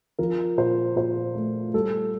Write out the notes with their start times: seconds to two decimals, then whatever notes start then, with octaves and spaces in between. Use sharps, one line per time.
0.19 F3 A#4
0.58 A#2 C5
0.96 A#2 C5
1.35 A3
1.74 G3 A4